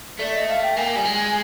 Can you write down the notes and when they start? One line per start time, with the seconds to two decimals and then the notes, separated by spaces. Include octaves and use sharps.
0.19 A3 D5
0.34 D#5
0.48 F5
0.63 G5
0.77 A#3 G#5
0.84 G5
0.92 G3 G#5
1.05 G#3